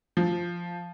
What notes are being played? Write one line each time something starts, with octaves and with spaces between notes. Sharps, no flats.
F3